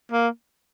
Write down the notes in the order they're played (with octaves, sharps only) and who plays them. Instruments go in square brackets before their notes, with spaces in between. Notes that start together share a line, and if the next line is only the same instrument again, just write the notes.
[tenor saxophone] A#3